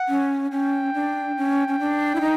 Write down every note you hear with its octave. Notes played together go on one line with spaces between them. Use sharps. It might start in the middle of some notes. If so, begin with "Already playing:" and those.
Already playing: F#5
C#4
C#4 G5
D4
C#4
C#4
D4
E4
D#4